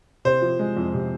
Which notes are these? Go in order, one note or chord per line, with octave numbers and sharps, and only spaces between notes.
C3 C5
F3
G#3
F2
C3